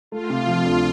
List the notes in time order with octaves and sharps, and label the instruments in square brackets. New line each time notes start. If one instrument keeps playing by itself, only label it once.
[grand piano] A3 [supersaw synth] F4
[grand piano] C3
F3
D2